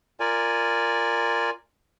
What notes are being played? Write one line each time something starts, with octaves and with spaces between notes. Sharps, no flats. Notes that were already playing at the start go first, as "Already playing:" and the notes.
F4 A#4 D5 G#5